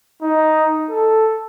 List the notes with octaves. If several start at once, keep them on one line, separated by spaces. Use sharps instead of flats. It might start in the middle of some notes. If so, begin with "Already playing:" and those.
D#4
A4